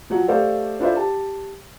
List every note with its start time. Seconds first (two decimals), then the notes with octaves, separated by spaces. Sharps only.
0.10 F3 F#3 F#5
0.28 A3 G4 A4 C5 D5 F5
0.80 D4 E4 F4 A4 C5 E5
0.96 G4 A5